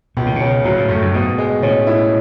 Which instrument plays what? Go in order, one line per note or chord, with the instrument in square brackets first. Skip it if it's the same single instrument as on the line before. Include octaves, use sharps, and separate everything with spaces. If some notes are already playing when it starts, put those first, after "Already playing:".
[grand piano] C#2 [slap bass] B2
[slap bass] A2
B2
[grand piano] C#3
[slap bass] A2 [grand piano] F#3
[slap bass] A2
[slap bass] F#2 [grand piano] A3
[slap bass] F#2
[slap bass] G#2 [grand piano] B2
[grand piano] G#3
[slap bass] A2 [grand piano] C#4
[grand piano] E4